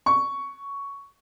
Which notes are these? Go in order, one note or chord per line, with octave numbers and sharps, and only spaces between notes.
C#6